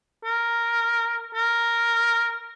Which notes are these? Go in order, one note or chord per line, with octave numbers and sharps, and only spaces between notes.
A#4
A#4